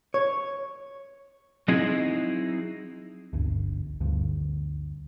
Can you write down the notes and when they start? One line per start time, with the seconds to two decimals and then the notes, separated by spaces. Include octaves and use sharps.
0.14 C#5
1.68 F#3 C4 D#4 E4 G#4
3.33 G1 D2
4.00 G1 D2 G2